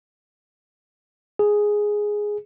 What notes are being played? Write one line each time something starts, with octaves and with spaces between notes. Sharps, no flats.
G#4